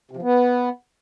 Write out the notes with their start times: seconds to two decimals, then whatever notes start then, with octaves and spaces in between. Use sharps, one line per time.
0.11 C3
0.17 F3
0.22 B3